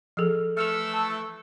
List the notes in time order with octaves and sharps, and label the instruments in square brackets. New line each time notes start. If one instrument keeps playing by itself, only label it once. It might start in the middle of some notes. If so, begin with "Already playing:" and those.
[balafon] F3 G#4 [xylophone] A4 E6 F6
[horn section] E3 A3 [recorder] E6 [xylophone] F6 C#7 F7
[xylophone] A5